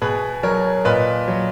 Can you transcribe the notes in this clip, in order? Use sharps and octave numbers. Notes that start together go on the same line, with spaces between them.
B2 G#4 B4
F#3 A#4 C#5
A#2 B4 D#5
F#3